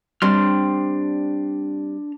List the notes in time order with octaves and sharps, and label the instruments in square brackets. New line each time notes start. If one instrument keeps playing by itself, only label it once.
[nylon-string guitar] G3 C4 [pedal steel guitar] D4 C6 F6